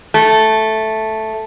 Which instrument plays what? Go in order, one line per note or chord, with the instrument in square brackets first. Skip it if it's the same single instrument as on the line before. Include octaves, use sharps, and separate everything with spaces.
[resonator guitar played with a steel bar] A3